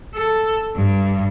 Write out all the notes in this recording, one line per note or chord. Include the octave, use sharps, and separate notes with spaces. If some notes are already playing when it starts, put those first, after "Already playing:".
A4
G2